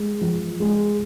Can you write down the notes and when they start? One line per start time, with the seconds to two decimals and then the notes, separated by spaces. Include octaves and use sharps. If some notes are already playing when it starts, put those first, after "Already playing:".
Already playing: G#3
0.21 F3
0.60 G#3